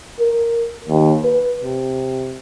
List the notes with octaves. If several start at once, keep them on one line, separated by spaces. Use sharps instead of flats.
A#4
D#2
B4
C3